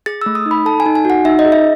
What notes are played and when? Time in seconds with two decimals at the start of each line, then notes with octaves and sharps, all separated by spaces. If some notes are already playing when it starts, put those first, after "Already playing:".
0.06 G#4 A6
0.21 E6
0.26 A3
0.35 D#6
0.46 D#4
0.51 B5
0.65 A4 A5
0.80 G#5
0.86 D#4
0.95 G#5
1.05 F#4 F#5
1.25 D#4 E5
1.39 D#5
1.45 G#4
1.52 E5